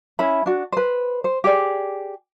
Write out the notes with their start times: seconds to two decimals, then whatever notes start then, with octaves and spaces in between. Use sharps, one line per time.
0.19 C#4 E4 E5 B5
0.46 D4 F#4
0.72 B4 C5
1.24 C5
1.44 G4 G#4 D5